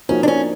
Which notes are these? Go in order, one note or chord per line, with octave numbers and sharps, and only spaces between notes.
F3 A#3 C#4 D#4 F#4
D4
C#4